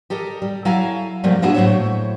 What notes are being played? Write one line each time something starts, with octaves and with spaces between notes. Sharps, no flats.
G4 A4 A#4 D#5
G3
F#3 E4 A4 F5 G#5 A#5
F#2 C3 F3 G3 A3 A#3
A#3 B3 D4 E4 F#4 G#4
A2 F#3 C4 C5 C#5 E5